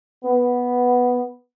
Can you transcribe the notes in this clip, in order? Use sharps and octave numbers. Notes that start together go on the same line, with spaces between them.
B3